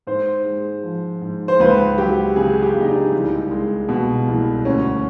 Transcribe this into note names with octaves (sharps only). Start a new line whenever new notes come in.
G#2 C5
G#3
F3
G#2
C5
C#2 B4
F#3 G4
C#3 G#4
G4
C#2
D#4
D4
C2
G#3
B2
C2
D2 C#4